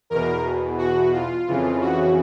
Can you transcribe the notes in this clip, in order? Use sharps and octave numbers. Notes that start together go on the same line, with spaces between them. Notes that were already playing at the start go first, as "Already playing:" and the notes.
E2 B2 A#4
F#4
F4
F2 C#3 E3
F#4